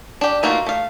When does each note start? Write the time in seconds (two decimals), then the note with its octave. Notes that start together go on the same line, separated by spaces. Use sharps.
0.21 D4 G4
0.43 A3 A#3 D#4 F4 F#4
0.66 A3 F5